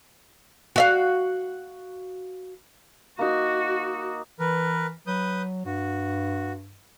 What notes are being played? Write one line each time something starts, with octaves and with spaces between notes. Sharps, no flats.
F#4 E5 F5
A#3 D#4 F#4
E3 A#4 B4
F#3 B4 D#6 G6
G2 F#4